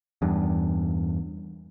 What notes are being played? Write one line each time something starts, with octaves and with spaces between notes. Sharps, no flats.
E2 G2